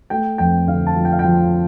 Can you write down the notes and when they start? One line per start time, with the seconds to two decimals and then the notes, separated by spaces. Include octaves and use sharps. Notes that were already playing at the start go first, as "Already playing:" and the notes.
0.10 A3 G5
0.38 F2 G5
0.68 D3 F5
0.87 A5
0.96 F3
1.05 G5
1.12 F5
1.19 G5
1.24 F3